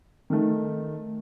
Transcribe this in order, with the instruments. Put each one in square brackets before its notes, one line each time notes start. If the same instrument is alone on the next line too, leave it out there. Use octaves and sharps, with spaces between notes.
[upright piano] D#3 A3